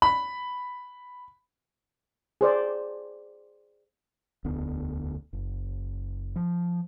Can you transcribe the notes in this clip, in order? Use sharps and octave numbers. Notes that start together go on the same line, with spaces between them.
B5
G#4 C5 D5
E1 D2 D3 B3
F#1
F3